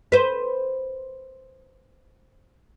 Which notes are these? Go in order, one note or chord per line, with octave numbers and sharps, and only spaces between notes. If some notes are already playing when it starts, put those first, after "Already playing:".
B4 C5